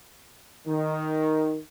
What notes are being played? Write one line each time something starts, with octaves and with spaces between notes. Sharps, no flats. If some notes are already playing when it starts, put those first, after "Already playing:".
D#3